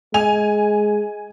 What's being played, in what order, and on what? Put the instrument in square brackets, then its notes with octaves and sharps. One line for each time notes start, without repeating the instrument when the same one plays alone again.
[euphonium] G#3 [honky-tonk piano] G#5 F7